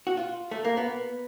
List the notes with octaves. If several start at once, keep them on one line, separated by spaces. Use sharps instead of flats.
F#4
F4
A3
A#3
B3